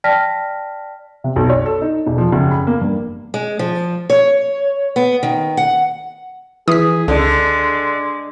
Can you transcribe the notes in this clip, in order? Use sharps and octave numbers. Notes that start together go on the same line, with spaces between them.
D5 G5 A5 F6 A#6 B6
C3
B1
C#5
A4
D#4
E1
F3
F#1
B5
A#3
G2
G#3
F3
C#5
B3
D#3
F#5
E3 G#4 D#6 B6
C#2 D3 G#3 A4 D5